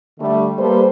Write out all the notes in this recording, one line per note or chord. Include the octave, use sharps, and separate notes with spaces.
D3 G3 A3
G3 A#3 A4 B4 C5